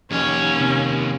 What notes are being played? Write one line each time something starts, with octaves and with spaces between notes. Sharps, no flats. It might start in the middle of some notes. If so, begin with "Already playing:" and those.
F1 D#2 C#4 C#5
C3 C4